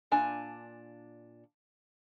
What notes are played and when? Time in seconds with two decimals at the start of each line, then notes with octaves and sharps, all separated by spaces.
0.11 A#2 D4 G#5